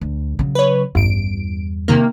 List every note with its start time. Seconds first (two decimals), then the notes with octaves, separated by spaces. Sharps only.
0.01 D2
0.39 C#3 F#3
0.55 B4 C#5
0.95 A1 E2 G2 D7
1.88 C3 D#3 A#3